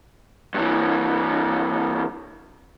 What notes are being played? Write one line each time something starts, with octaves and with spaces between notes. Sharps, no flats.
G2 E3